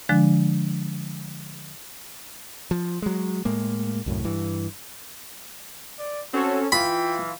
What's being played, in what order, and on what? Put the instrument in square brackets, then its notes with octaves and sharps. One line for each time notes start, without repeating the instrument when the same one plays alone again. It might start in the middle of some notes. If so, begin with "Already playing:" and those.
[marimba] D3 F3 G#3 D4
[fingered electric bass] F3
F#3 G#3
A2 G#3 A#3
C2 F#2 A2
G2 E3
[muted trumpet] D5
[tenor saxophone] C4 [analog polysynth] C#4 A4 C#5 [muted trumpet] F#4
[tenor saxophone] E3 [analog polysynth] F4 [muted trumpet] G5 [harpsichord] B5